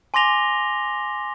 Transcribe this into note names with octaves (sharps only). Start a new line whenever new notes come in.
G#5 C6 D6 A#6 F7 G7